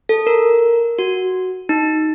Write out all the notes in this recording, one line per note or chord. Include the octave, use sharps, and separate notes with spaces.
A4
A#4
F#4
D#4